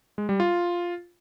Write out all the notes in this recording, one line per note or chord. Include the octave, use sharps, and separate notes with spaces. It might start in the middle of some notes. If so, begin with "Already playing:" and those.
G#3
G3
F4